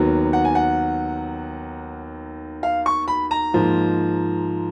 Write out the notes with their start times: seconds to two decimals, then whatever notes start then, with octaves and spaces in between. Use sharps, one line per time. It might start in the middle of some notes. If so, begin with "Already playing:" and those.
Already playing: D#2 D#3 F#3 B3
0.33 F#5
0.45 G#5
0.55 F#5
2.63 F5
2.86 C#6
3.08 B5
3.31 A#5
3.54 G#2 F3 A#3